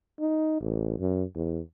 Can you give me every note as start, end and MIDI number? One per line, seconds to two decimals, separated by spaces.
0.20 0.59 63
0.61 0.96 33
0.99 1.24 42
1.35 1.60 40